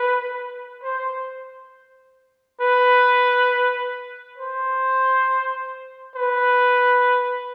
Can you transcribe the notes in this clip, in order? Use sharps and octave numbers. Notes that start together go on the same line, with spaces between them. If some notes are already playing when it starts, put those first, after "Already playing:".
Already playing: B4
C5
B4
C5
B4